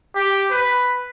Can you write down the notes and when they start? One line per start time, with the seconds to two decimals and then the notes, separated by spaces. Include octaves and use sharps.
0.15 G4
0.51 B4